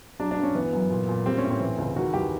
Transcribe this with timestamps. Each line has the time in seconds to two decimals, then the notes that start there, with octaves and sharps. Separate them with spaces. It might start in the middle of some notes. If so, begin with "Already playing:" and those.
0.19 F#3 D4
0.31 D4
0.37 G2
0.43 C#4
0.55 E3 B3
0.73 F#2
0.90 A#2
1.08 A#2
1.26 G3 C4
1.38 C#4
1.44 A2
1.50 C4
1.61 E3
1.78 C#2
1.96 D#3 F#4
2.14 E2 G4